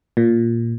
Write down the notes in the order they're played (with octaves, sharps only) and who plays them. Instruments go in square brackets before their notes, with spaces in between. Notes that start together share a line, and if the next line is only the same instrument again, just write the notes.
[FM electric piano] A#2